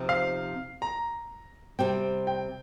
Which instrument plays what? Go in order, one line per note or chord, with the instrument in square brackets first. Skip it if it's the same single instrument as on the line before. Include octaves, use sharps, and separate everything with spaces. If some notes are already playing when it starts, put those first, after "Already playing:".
Already playing: [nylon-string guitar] C3 F3 C4 D#4
[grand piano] F5
A#5
[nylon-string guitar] C3 G3 C4 [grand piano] G5
[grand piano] G5